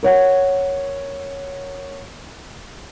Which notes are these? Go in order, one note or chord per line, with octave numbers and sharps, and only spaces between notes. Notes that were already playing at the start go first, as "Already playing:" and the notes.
A#4 C#5 F#5